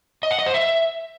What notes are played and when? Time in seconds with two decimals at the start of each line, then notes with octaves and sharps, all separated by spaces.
0.23 D#5
0.31 F#5
0.39 D#5
0.46 C5
0.54 E5